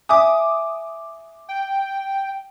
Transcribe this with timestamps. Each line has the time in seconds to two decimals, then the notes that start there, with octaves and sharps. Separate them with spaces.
0.09 E5 G#5 D6 D#6
1.49 G5